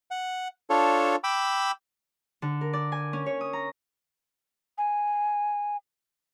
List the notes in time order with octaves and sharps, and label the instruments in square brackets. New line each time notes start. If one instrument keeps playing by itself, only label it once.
[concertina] F#5
D4 F4 A4 C#5
G5 B5 D6 E6
[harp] D3
A#4
D5
G#5
C#4
C#5
D#6
A#5
[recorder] G#5